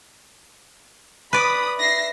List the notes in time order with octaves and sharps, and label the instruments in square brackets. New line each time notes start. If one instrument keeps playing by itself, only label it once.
[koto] B4 D5 [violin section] B5 D#6
[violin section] E5 A#6 C7